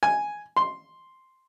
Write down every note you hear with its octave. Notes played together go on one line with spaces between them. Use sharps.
G#5
C6